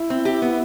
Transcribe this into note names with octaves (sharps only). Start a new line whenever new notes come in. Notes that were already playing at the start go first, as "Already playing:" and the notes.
Already playing: E4
C4
G4
B3